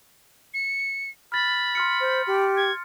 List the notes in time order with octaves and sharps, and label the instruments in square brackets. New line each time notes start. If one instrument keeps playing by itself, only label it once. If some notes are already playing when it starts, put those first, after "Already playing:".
[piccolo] C#7
[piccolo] B5 [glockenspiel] F6 A6
[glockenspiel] C6 F6 C#7
[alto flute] C5
G4
[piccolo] G#6